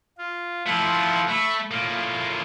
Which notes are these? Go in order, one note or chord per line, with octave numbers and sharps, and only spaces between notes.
F4
F3 A3 E4 F4 F#5
A3 E5 B5 C#6
A2 A#3 F4